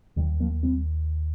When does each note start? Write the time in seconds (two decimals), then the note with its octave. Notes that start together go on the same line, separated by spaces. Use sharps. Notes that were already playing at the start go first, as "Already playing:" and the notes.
0.16 D#2 D#3 G3
0.40 F3 A#3
0.63 G3 C4